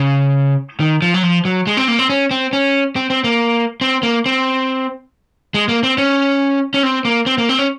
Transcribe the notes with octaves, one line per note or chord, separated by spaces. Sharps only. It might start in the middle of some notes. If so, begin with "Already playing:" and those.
Already playing: C#3
D#3
F3
F#3
F3
F#3
G#3
C4
A#3
C4
C#4
C4
C#4
C4
C4
A#3
C4
A#3
C4
G#3
A#3
C4
C#4
C#4
C4
A#3
C4
A#3
C4
C#4